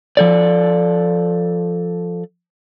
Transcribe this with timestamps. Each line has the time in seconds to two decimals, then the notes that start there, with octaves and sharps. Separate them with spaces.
0.17 F3 A4 D5